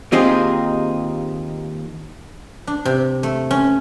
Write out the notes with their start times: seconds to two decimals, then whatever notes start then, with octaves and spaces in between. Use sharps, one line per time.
0.12 D#2 C4 D#4 F4 G4 G#4
2.67 D4
2.85 C3
3.23 A3
3.51 C#4